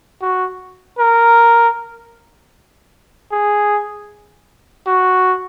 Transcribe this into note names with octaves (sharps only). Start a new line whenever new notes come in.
F#4
A#4
G#4
F#4